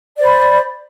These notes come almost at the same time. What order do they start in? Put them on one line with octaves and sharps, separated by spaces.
D5 C5 B5